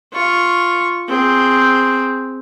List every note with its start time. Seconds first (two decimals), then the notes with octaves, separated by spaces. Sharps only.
0.13 F4 C#6
1.09 C4 G#4